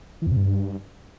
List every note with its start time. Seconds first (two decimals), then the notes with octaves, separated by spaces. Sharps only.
0.22 E3
0.27 F2
0.32 C3
0.37 G2